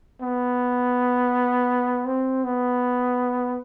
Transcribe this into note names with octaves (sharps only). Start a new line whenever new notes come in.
B3
C4
B3